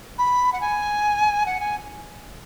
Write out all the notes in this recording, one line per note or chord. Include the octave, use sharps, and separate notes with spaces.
B5
F#5
G#5
F#5
G#5